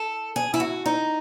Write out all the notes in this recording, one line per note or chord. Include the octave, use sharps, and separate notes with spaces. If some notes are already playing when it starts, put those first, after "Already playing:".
Already playing: A4
G#4
E4
F#4
D#4